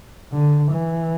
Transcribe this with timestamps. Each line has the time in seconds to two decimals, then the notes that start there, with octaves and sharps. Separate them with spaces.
0.33 D3
0.73 E3